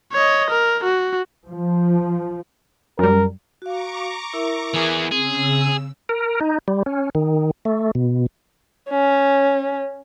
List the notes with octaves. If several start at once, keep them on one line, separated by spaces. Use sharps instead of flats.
C#5 D#5
A#4
F#4
F3
F#2 G3 A#4
F#4 F5 A#5 C#6 D6
E4 A#4 E5
E3 G#4
C#3 C4 G#4 E6
A#4
D#4
G3
C#4
D#3
A3
B2
C#4